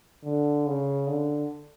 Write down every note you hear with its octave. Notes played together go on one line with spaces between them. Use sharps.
D3
C#3
D3